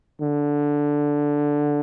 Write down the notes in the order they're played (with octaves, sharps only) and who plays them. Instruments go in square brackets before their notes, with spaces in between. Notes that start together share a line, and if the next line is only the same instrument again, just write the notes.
[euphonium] D3